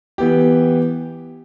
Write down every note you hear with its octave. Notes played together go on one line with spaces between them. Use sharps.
E3 B3 G4